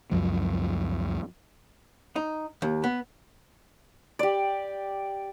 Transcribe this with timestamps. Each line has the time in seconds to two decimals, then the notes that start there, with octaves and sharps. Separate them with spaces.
0.12 C#2 F#2 F3
2.16 D#4
2.62 D#2
2.84 B3
4.19 G4 D5